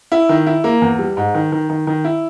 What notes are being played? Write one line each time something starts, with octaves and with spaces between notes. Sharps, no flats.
E4
D#3
E4
A#3
E2
G3
G#2
D#3
D#3
D#3
D#3
E4